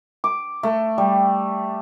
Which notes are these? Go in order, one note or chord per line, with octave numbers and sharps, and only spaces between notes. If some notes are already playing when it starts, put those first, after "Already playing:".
D6
A3
G3